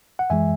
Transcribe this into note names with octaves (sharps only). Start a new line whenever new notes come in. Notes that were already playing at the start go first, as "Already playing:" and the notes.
F#5
F#2 E3 G#3 E5 G#5